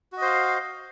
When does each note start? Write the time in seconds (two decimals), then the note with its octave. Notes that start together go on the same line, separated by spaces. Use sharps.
0.12 F#4
0.17 D#5
0.22 C5
0.26 F5